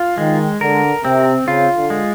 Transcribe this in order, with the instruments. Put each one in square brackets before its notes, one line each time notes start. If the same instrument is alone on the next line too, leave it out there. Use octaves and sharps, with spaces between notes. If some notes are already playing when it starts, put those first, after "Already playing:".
Already playing: [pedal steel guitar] F4
[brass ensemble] D#3 [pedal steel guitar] G#3
[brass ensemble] D3 [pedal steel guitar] A#4
[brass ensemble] C3 [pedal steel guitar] C4
[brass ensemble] C#3 [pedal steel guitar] F4
[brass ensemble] D3
[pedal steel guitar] G#3